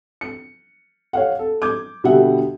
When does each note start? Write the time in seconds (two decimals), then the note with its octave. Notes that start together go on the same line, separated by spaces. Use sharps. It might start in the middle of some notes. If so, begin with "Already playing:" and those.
0.21 C#7
1.13 C#5 F5 F#5
1.39 A4
1.62 D6 G6 G#6
2.04 B2 D3 G3 E5 F#5